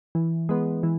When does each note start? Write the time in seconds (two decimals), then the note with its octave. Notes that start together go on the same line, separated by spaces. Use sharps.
0.15 E3
0.49 G#3 B3
0.83 E3